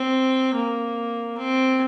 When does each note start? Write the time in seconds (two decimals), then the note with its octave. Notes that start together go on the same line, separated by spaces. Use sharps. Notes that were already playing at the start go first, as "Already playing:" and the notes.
Already playing: C4
0.55 A#3
1.38 C4